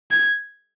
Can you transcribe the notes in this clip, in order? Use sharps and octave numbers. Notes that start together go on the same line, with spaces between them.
G#6